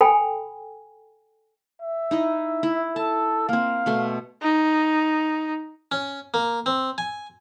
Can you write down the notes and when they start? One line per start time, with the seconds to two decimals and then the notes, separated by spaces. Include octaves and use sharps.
0.01 A4 G5 G#5 B5
1.81 E5
2.11 D#4 E4 D#5
2.63 E4
2.96 A4 A5
3.49 A#3 C4 F5
3.86 B2 A3 C6
4.42 D#4
5.92 C#4
6.34 A#3
6.66 C4
6.98 G#5